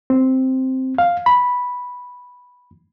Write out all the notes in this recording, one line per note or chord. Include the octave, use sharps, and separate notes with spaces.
C4
F5
B5